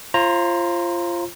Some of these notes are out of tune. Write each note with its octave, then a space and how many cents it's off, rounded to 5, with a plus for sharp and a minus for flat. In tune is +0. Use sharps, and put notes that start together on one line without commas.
F4 -20 C5 +35 A#5 +0